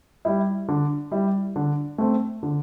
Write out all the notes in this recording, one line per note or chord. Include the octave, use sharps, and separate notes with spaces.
G3 E4
D3
G3 E4
D3
A3 C4
D3